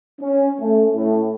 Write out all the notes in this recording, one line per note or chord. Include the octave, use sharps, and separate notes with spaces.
C#4
A3
A2